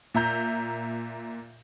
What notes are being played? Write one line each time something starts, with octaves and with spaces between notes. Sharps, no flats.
A#2 E5 A#5 G6